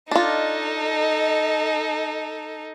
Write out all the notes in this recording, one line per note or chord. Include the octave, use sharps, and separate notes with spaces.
D4 D#4 F4 A4 D#5